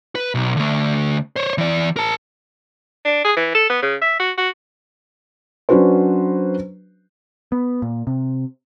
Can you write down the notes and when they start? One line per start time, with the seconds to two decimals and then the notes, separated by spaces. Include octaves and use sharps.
0.15 B4
0.35 B1
0.57 D3 A3
1.36 C5 C#5
1.58 E3 D5
1.97 A#4 A5
3.05 D4
3.24 G#4
3.37 E3
3.55 A4
3.69 B3
3.82 C#3
4.01 E5
4.20 F#4
4.38 F#4
5.69 F#3 C#4 D4 F#4 B4 C5
7.52 B3
7.82 A#2
8.07 C3